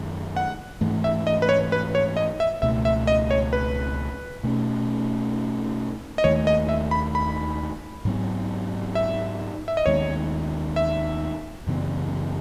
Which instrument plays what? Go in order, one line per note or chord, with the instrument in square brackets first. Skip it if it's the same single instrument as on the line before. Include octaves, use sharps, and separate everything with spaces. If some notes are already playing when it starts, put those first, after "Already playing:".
Already playing: [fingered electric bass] F#2 D#3 G#3
[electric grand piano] F#5
[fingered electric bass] G#2 E3 A3
[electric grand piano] E5
D#5
B4
C#5
B4
C#5
D#5
E5
[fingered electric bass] C#2 B2 A3 [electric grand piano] E5
[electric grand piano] E5
D#5
C#5
B4
[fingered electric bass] B2 A3 C#4
[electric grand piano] D#5
[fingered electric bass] D#2 D#3 A3 [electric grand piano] C#5
[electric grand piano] D#5
E5
B5
B5
[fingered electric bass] G#2 F#3 B3
[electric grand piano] E5
E5
D#5
[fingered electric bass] D#2 D#3 G#3 B3 [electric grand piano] C#5
[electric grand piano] E5
[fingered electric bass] F#2 C#3 E3 B3